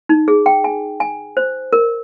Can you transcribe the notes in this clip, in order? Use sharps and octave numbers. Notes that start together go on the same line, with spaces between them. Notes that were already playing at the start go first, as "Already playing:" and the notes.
D#4
G#4
G5
G#5
G#5
C5
A#4